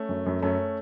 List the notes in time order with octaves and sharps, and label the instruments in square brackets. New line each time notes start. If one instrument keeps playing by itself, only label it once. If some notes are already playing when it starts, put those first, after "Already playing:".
Already playing: [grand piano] A3 C#4
[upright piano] F#2
F#2
[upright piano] F#2 [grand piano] A3 C#4